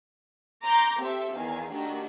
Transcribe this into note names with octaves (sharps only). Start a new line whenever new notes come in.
A#5 C6 D6 G6
C4 G4 A4 C5 E5
E2 D#3 F5 G#5
D#3 A3 D4 F#4 G4